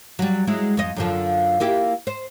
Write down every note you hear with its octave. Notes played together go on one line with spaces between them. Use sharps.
F#3 G3
F#3 G#3 E4
F2 D#5
F#2 D3 F3
A#3 E4 G4
C5